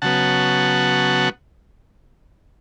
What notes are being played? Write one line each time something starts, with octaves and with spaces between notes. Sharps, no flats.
C#3 F#3 B3 F#5 A5